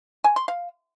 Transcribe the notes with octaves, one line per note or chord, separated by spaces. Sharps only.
G#5
C6
F5